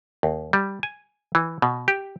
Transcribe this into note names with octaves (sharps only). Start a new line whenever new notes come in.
D#2
G3
G#5
E3
B2
G4